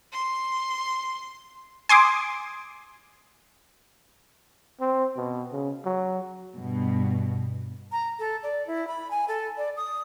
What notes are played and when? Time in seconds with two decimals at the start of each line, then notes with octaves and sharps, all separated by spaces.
0.12 C6
1.89 G#5 C6 D6 D#6
4.80 C4
5.17 B2
5.52 C#3
5.85 F#3
6.54 G2 B2
7.92 A#5
8.19 A4
8.43 D5
8.67 E4
8.87 B5
9.10 G#5
9.28 A4
9.57 D5
9.77 D#6